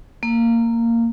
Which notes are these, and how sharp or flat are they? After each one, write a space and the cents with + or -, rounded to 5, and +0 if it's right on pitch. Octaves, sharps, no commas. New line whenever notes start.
A#3 -15